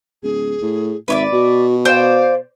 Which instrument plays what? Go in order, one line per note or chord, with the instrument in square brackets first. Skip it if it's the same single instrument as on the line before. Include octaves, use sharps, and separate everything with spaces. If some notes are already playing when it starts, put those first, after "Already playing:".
[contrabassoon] D1 [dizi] G#4
[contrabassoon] A2
[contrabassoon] G#1 [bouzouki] B4 C#5 D5 [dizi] E5
[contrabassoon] B2 [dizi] F#4
[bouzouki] C5 D5 G5 [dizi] F5